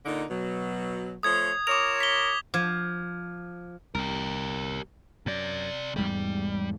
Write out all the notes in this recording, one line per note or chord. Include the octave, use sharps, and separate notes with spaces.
A#2 D3 D#4
B2 F#3
F3 A3 C#5 D#6 G#6
F4 A#4 C#5 D6 F7
B6 G7
F3 D6 F6 G#6
C2 G4 A#4
F#2 C3 D5
E2 G#2 G3 G#3